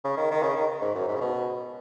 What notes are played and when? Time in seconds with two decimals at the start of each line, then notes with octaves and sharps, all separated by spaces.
0.04 C#3
0.17 D#3
0.31 D#3
0.43 C#3
0.56 D#3
0.81 G#2
0.95 F#2
1.08 G#2
1.15 C#3
1.21 B2